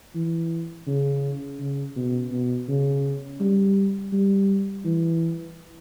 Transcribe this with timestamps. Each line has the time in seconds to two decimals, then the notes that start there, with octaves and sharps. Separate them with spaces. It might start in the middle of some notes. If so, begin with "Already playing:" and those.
0.15 E3
0.87 C#3
1.59 C#3
1.96 B2
2.32 B2
2.69 C#3
3.40 G3
4.13 G3
4.85 E3